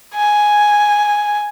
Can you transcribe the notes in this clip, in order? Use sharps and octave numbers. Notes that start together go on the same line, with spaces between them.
G#5